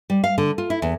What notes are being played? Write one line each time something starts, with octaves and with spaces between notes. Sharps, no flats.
G3
F5
D3
F4
E4
E2